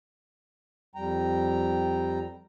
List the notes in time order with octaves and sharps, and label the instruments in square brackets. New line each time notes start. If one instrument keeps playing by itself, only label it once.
[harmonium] F2 G3 G5 A#5